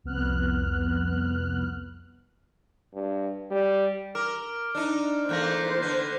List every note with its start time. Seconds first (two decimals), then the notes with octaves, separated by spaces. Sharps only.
0.04 C2 F2 B3 F6 F#6
2.94 G2
3.51 G3
4.15 A#4 D6 F6 D7
4.75 D4 D#4
5.29 E2 A3 A#3 C5 F#6 G6 A#6
5.82 D3 B4